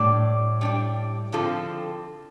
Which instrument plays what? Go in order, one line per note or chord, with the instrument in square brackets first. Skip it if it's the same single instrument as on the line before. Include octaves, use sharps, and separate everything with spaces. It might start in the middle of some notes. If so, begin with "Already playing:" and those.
Already playing: [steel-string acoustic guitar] A2 [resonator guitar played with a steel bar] G3 D4 G4 D5
[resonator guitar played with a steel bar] G3 D4 G4 D5
D3 F3 C4 F4 A4